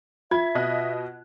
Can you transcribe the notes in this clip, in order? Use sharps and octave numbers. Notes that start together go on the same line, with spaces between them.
F4 E5 G#6
B2 D#5 F#6